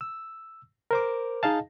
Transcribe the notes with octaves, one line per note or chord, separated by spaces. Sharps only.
E6
A#4 C5 D6
D#4 G#4 D#5 F5 A5